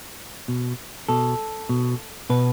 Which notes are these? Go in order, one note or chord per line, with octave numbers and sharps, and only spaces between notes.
B2
B2 A4
B2
B2 B4